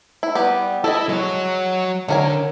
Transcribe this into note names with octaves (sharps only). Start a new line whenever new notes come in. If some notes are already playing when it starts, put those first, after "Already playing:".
E4
G3 B3 G4
E4 A4 D#5 E5
F#3 G#3 C#5
D3 C#4 A#4 G#5